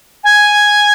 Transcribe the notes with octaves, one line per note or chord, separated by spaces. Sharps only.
G#5